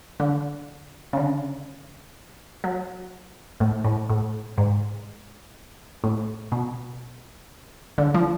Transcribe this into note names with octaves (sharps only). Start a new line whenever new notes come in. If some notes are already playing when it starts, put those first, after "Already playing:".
D3
C#3
D3
F#3
A2
A2
A2
G#2
A2
B2
D3
F3